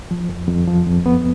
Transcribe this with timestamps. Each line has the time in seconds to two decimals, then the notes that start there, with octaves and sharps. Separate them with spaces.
0.11 F3
0.29 F2
0.48 F2
0.67 F3
0.86 F2
1.06 B3